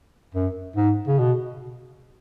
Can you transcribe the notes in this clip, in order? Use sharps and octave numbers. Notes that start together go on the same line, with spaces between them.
F#2
G#2
C#3
B2